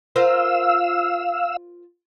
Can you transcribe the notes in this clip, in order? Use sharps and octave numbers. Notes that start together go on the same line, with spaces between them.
F4 A#4 C5 F5 E6